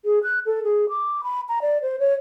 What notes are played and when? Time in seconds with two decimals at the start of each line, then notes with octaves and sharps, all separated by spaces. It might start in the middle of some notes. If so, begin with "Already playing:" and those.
0.05 G#4
0.23 F#6
0.46 A4
0.64 G#4
0.89 D6
1.23 B5
1.49 A#5
1.62 D5
1.82 C5
1.99 C#5